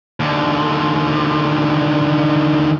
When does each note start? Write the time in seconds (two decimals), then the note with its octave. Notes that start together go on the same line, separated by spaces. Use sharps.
0.20 D#2 D3